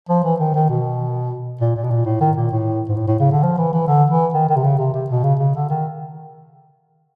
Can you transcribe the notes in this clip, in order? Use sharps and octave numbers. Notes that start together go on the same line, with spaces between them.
F3
E3
D#3
D#3
B2
A#2
A#2
B2
A#2
A2
D#3
A#2
A2
G#2
A2
A2
C#3
D3
F3
E3
E3
D3
E3
D#3
D#3
C3
C#3
C3
C3
B2
C#3
C#3
D3
D#3